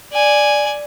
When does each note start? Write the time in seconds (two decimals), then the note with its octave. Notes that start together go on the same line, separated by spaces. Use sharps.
0.12 D5 G#5